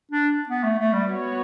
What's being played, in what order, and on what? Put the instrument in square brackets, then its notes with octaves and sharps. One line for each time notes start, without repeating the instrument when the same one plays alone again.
[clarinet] D4
B3
A3
A3
G3
[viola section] B3 F#4 C#5